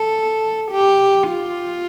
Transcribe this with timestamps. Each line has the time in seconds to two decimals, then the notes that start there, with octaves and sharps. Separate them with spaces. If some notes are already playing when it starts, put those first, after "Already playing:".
Already playing: A4
0.71 G4
1.31 F4